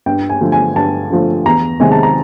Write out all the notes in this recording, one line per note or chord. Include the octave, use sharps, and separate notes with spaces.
G2 G5
G#5
D3 F3 A3
G#5
G2 A5
D3 F3 A3
E2 A#5
C3 D#3 G#3 G#5
A5
A#5